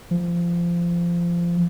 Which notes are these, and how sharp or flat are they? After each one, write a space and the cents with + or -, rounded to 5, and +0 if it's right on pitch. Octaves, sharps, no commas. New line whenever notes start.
F3 -20